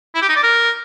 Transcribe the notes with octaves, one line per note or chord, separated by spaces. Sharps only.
E4
G4
D#4
D5
A#4